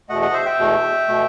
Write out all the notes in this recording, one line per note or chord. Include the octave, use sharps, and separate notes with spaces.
E2 B2 A3 D#5 F#5
D#5 F#5
C5 E5
E5 G5
E2 B2 A3
B2 A3